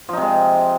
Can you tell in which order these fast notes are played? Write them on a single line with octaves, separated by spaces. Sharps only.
F3 D#4 C3 G#3